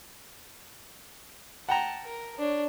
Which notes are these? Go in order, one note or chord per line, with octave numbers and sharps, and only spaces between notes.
F#5 G5 A5 A#5
A#4
D4 C#5